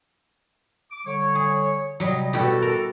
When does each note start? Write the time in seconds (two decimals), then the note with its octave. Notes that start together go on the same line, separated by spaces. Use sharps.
0.91 D6
1.06 D3 G3 C#5
1.35 G#4
2.00 C3 F#3 G3 D#5
2.33 B2 E4 F#4 G4 A4
2.62 A#4